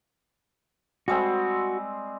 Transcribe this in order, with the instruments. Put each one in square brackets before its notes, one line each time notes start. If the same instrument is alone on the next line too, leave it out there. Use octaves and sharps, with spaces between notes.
[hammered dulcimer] G3 G#3 C4 [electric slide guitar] F#4